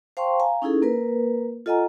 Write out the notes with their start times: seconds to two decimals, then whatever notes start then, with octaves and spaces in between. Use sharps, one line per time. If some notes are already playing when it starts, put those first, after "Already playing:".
0.17 C5 F5 G5 A5 C6 C#6
0.40 F5 G#5 A#5
0.62 C#4 D#4 E4 G#4 A4
0.82 A#3 A#4 B4
1.66 F4 A4 D#5 F#5 G#5 A#5